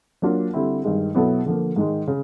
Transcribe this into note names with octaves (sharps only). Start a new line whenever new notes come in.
F#3 A#3 D4 F4
D3 G3 C4 E4
G2 D#3 G#3
B2 F#3 B3 E4 A4
D3 F3 A#3
G#2 D#3 G#3
C#3